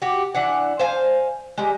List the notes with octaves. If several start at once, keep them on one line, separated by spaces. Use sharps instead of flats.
F#4 G4
E3 D4 F#5
C5 F5 G5 G#5
G3 G#3